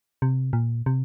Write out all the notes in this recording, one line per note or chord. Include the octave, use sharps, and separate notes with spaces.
C3
A#2
C3